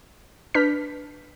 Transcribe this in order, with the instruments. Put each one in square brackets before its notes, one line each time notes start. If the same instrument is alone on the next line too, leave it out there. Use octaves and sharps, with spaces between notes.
[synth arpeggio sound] D4 B4 F6 G6 B6